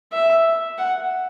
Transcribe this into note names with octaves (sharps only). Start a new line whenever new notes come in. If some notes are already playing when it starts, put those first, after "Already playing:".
E5
F#5